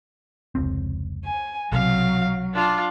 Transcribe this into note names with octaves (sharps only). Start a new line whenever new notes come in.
F1 C#2 C4
G#5
B1 C3 F#3 F5
D4 F4